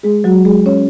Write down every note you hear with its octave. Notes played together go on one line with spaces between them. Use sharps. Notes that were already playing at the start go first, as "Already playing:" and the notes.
G#3 G#4
F#3 F#4
G#3 G#4
C#4 C#5